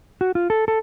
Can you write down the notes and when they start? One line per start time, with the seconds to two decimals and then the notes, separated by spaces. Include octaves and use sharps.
0.21 F#4
0.35 F4
0.50 A4
0.68 A4